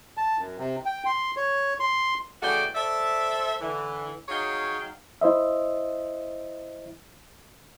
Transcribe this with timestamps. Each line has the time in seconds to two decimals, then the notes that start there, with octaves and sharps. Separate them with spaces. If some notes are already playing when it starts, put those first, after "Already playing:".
0.17 A5
0.38 F#2
0.58 C3
0.85 G5
1.06 C6
1.37 C#5
1.80 C6
2.43 C#3 E3 A3 F#4 D5 G5
2.75 A4 C5 D5 E5
3.61 D3 E3
4.29 F#3 D#4 G#4 C#5 F5 G5
5.21 E4 C5 D#5 E5